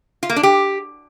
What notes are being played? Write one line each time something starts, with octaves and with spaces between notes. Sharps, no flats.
F4
A#3
D4
G4